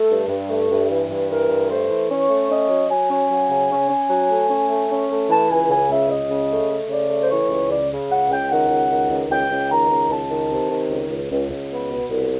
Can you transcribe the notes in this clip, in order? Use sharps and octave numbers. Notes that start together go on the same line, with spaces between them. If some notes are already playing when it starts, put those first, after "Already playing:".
Already playing: A3 A4
G2
G2
A3
G2
E3
G2
E3 A#4
G2
A3 C5
E3
C#4 C#5
A3
C#4 D#5
F#3
F#3 G#5
C#4
F#3
C#3
C#4
C#4
F#3
A3
C#4
A3
C#4
A3
E3 A5
C#2 G#5
C#3 G#5
C#2 E5
C#2 D#5
C#3
A3
A3
C#3 D5
A3
C5
E3 C#5
C#2
C#3 D5
C#3
C#2 F#5
C#2 G5
D#3 F#5
C#2
D#3
C#2
C#2 G5
C#2
D#3 A#5
C#2
C#2 A5
D#3
C3
D#3
C#2
C#2
C#2
C#2
B3
B2
C2